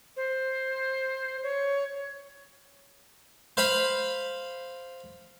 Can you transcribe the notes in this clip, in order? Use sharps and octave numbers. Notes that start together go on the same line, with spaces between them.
C5
C#5
C5 F5 B5